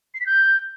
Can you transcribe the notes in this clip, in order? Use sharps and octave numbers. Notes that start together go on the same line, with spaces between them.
C7
B6
G6